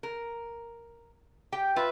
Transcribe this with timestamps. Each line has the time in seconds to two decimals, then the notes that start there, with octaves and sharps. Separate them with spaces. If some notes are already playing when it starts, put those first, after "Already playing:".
0.03 A#4
1.52 G4 G5
1.76 F4 B4 E5